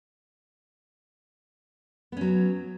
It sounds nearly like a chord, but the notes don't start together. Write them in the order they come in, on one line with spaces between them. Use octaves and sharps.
B3 C#4 F#3